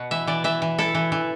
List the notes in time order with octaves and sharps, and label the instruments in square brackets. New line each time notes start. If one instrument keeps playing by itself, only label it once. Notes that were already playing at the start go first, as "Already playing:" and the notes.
Already playing: [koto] B2 F#5
E3 E5
E3 D5
E3 E5
E3
E4 A4
E3
E3